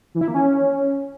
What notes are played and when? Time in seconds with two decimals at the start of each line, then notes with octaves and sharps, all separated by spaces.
0.15 E3
0.21 E4
0.28 A#3
0.34 C#4